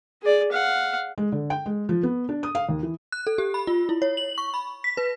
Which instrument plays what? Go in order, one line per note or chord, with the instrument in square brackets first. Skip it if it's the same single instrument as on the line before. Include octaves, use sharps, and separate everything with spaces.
[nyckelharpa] G#4 D5
F5 F#5
[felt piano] G#3
D3
G5
G#3
F3
B3
D4
D#6
F5
D#2
E3
[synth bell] F#6
A4
G4
B5
F4
E4
C#5
F#7
C#6
B5
B6
B4